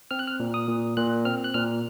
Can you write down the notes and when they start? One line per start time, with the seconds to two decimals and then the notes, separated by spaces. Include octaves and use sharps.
0.11 C4 F6
0.19 F#6
0.28 F6
0.40 A#2
0.54 D#6
0.68 A#2
0.97 A#2 F#6
1.25 C4 F6
1.44 F#6
1.54 A#2 F6